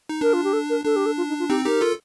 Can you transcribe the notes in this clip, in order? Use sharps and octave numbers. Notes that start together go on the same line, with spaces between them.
D#4
D4 A#4
F4
G4
A4
A#4
D4 A4
G4
A4
F4
D#4
F4
C4 D#4 G4
D#4 G4 A#4
F4 A4